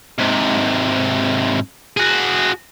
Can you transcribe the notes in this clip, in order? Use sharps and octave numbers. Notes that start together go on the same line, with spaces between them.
G#2 C3
F#4 G#4